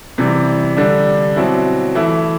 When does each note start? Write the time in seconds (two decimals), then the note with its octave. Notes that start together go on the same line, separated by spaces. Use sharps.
0.18 C3 E3 G3
0.77 D3 G3 D4
1.36 B2 F#3 C4 E4
1.95 E3 A3 E4